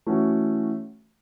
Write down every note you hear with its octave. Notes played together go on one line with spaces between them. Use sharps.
E3 A3 C#4 F#4